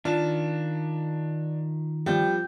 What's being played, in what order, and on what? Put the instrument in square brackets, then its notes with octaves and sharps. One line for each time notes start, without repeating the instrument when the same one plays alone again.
[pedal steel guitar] D#3 A5 [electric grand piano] D4 [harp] F4 F5
[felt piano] F3 C4 [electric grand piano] G3 [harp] G5 G6